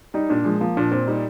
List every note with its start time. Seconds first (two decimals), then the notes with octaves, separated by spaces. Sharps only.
0.14 G3 D#4
0.29 A#2 D4
0.45 F3 G#3
0.61 F3 A#3
0.77 A#2 D4
0.92 A#2 C4
1.07 G3 D#4